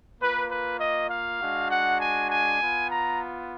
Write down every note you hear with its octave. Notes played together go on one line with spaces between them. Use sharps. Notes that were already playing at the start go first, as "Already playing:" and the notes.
A#3 F4 B4
B4
D#5
F5
G#3 D4 F#4
F#5
G#5
G#5
B3 F4
A#5